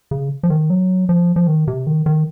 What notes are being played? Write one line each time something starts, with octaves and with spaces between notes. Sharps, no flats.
C#3
F3
D#3
F#3
F3
F3
D#3
C3
D#3
D#3